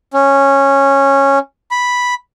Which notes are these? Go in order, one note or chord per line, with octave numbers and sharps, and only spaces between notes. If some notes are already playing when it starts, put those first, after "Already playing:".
C#4
B5